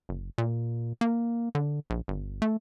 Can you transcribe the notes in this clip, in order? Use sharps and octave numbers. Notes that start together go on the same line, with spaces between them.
F#1
A#2
A#3
D3
A#1
G1
A3